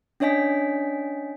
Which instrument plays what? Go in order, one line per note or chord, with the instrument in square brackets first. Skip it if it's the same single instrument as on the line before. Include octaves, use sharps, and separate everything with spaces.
[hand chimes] C#4 D4 C#5 D#5 G#5 B6